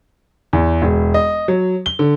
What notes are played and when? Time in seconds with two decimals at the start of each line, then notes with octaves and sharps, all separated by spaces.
0.53 E2
0.82 E1
1.14 D#5
1.48 F#3
1.86 G7
1.99 D3